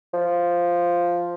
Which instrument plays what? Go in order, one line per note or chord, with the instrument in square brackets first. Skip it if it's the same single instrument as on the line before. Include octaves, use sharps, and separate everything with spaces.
[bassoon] F3